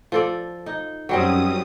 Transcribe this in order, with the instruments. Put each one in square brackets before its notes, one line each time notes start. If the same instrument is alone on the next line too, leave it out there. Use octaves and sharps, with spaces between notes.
[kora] F3 A4 D5
D#4
[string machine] F#2 D#6 [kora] F#3 G3 C4